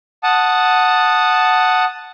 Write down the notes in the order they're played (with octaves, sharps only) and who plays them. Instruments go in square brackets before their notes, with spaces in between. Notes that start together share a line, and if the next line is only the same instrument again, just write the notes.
[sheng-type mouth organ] F#5 A5 D#6